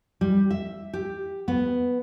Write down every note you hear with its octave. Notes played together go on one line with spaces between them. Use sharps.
G3
E5
G4
B3